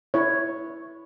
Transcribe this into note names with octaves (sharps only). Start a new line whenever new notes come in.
E4 C#5